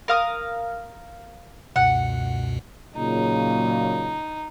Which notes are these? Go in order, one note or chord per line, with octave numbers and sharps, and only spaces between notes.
A#4 F5 D#6
C#2 F#2 B2 F#5
A#2 C#3 F#3 D#4